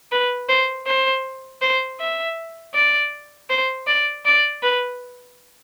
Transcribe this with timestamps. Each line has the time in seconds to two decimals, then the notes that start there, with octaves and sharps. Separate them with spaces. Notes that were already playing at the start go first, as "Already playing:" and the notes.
0.12 B4
0.49 C5
0.86 C5
1.61 C5
2.00 E5
2.74 D5
3.49 C5
3.87 D5
4.25 D5
4.62 B4